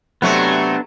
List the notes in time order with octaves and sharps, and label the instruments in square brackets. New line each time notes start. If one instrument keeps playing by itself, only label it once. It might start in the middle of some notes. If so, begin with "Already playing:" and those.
[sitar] C3 F#3 A3 [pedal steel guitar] B3 D4